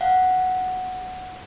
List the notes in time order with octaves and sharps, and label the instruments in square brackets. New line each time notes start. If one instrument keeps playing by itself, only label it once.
[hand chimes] F5 F#5